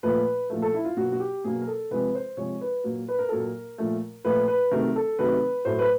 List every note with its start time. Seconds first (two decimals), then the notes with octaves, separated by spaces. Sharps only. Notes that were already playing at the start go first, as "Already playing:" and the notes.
0.03 A#2 F3 A3 B4
0.50 A#2 F3 A3
0.62 A4
0.74 E4
0.85 F4
0.97 B2 F#3 A#3 F#4
1.12 F#4
1.20 G4
1.44 B2 F#3 A#3 G#4
1.62 A#4
1.67 A4
1.91 C3 F3 G#3 B4
2.15 C5
2.37 C3 F3 G#3 C#5
2.61 B4
2.84 A#2 F#3 A#3
3.08 B4
3.19 A#4
3.29 A#2 F#3 A#3 A4
3.40 A#4
3.78 A#2 F3 A3
4.25 A#2 F3 A3 B4
4.48 B4
4.71 C3 D#3 F#3 A3 A#4
4.96 A4
5.19 C3 D#3 F#3 A3 B4
5.65 A2 F#3 A3 C5
5.79 B4